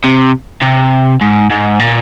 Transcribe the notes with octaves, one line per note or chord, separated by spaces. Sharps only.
C3
C3
G#2
G#2
A#2